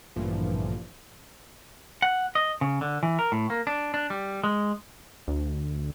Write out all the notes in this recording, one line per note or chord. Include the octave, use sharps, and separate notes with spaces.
A1 G2 A#2 D3 E3 F3
F#5
D#5
C#3
D3
E3
A#4
A2
A#3
D4
D4
G3
G#3
D2